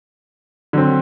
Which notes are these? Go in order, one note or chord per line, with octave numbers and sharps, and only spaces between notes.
D3 F#3 C4